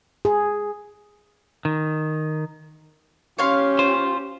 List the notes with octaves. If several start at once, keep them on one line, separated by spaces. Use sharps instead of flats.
G#4
D#3
C#4 G4 C#5 F5 C6
F4 C5